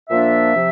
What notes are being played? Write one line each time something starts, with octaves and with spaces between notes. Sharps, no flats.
A#2 F3 A#3 D4 E5
C3 F3